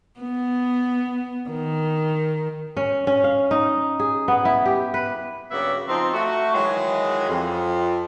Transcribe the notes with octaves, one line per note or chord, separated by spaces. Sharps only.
B3
D#3
C#4
C#4
F5
D#4
G#4
B3
E4
G4
B4
G2 C#3 F#3 A#3 B3 E5
F3 C4 D#4
A3 F#4
D#3 E3 F#3 G#3
F2